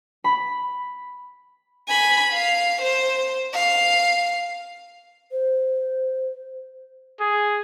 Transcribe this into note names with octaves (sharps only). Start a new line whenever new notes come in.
B5
G#5 B5
F5
C5
F5
C5
G#4